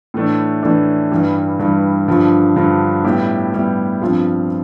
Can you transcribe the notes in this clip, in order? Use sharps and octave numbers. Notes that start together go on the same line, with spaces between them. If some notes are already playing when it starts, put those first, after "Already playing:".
A2 E3 A3 D4
A2 E3 A3 D4
G2 E3 G3
G2 E3 G3
G2 D3 F3
G2 D3 F3
A2 G3 B3 E4 G4
A2 G3 B3 E4 G4
G2 F3 C4 F4